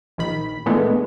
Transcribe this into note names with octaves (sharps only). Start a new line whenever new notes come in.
A#1 D#3 B5
A#2 D3 E3 G#3 A3 B3